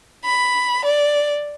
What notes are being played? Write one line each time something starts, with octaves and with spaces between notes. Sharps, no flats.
B5
D5